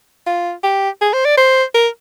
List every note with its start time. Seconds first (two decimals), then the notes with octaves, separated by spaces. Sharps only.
0.26 F4
0.63 G4
1.01 G#4
1.13 C5
1.25 D5
1.37 C5
1.75 A#4